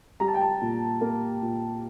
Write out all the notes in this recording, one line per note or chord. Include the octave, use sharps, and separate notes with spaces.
G3 A#5
A5
G5
A5
A#2
A#3
A#2